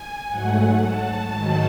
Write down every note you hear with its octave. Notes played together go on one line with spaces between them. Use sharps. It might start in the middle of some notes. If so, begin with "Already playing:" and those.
Already playing: G#5
G#2 F#3 A3 F#5
A5
G#2 D#3 F#3